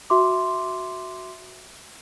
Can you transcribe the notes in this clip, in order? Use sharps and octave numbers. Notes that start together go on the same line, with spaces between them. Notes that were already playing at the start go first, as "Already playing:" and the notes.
F#4 E5 C6 D6